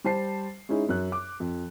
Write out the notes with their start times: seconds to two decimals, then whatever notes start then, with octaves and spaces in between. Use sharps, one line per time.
0.04 G3 C5 A5 C7
0.69 G#3 C#4 D#4 E4 G#4
0.89 F#2 F#6
1.12 D6
1.40 F2